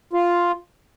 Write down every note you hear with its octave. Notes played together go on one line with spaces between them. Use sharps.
F4